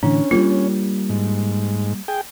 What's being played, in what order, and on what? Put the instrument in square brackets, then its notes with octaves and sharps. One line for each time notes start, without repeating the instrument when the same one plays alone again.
[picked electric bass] A2 D3 E3 [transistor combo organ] C#4 [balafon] D4
[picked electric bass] G3 G#3 A#3 [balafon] F4 C#5
[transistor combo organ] G#2
G#4 G5